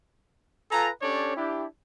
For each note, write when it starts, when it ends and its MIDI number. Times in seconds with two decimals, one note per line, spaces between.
0.70 0.90 65
0.70 0.90 69
0.70 0.90 71
0.70 0.90 80
0.70 0.90 82
1.02 1.34 61
1.02 1.34 62
1.02 1.34 67
1.02 1.34 69
1.02 1.34 73
1.02 1.34 74
1.36 1.66 62
1.36 1.66 64
1.36 1.66 67